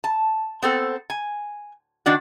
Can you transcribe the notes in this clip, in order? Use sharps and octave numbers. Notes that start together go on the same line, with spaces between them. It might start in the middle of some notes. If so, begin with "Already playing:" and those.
A5
B3 C4 A4
G#5
D#3 D4 F#4